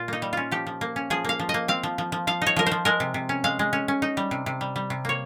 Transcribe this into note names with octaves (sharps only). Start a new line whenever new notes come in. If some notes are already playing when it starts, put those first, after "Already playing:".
Already playing: A#2 F4
A#3 D#4
G3
C#4 F4
F3 G4
F3
A#3
C#4
F3 G#4
A#3 F5
F3
D#5
A#3
C4 F5
F3
F3
F3
F3 F5
D#4 C#5
F3 A#4
C5
F3
G#3 A#4
C3
C3
C#4
G#3 F5
G#3
C#4
C#4
D#4
G3
C3
C3
G3
G3
C3
A#3 C#5